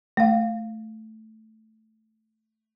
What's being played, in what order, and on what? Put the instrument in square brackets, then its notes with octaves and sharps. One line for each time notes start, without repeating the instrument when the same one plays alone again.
[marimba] A3 F5